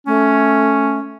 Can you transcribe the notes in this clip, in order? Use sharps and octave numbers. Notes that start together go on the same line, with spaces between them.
A3 C#4